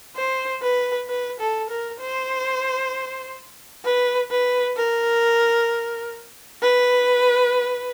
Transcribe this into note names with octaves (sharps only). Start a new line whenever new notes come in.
C5
B4
B4
A4
A#4
C5
B4
B4
A#4
B4